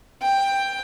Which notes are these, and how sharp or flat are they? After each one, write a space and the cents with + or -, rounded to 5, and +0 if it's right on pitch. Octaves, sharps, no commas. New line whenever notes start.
G5 +10